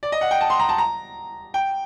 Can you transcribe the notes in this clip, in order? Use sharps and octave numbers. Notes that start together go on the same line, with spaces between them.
D5
D#5
F#5
G5
A5
C6
A#5
A5
A#5
G5